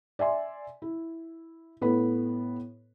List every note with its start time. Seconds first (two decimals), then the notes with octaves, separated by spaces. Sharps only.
0.19 D5 E5 G#5 C6
0.82 E4
1.81 A2 B3 A4 B4 B5